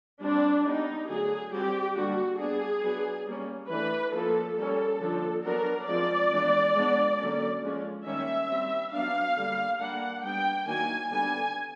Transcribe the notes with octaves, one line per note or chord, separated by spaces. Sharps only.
G3 C4 D4
G3 B3 D4 D#4
D3 F#3 A3 G#4
G3 C4 G4
D3 G3 A#3 D4 F#4
G3 B3 D4 G#4
F#3 B3 D4
G3 A#3 C#4
E3 A3 D4 B4
F3 A#3 C#4 A4
G3 A#3 C#4 A4
D3 F3 A#3 D4
F#3 B3 D4 A#4
F3 G#3 C4 D5
E3 G#3 B3 D4
F3 G#3 B3 D4
D3 F#3 A#3 C#4
F3 G#3 C#4
D#3 G3 A#3 C#4 E5
G3 C4
F#3 B3 D4 F5
D3 G3 A#3
G3 A#3 D4 F#5
G3 B3 D4 G5
D#3 F#3 A#3 D4 G#5
D3 G3 B3 D4 G#5